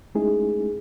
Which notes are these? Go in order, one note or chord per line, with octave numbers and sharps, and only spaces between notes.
G#3 A3 C#4 D#4 E4 G#4